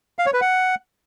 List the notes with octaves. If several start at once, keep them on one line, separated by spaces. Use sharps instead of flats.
F5
C#5
B4
F#5